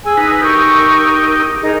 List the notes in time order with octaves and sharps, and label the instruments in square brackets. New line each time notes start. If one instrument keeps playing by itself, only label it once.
[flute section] G#4 G#5 E6
[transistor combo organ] D#4 B4
[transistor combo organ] D#4 G4 [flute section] A#4 C#6 E6
[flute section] D#4 G#4 A#4